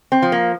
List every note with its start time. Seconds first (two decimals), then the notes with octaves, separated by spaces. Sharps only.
0.12 C4
0.22 F3
0.32 A#3